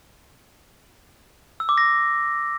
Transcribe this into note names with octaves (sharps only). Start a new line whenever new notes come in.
E6
D6
A#6